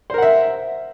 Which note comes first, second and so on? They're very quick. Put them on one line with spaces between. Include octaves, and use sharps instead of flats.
C5 A#4 F#5 E5